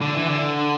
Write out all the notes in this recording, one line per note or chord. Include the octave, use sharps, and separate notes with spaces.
D3
E3
D3